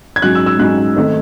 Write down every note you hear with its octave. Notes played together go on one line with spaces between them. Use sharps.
G#6
G#2 F#3 C#4 F#6
E6
E6
G#2 F#3 C#4 F#6
D#3 A3 C4 D#4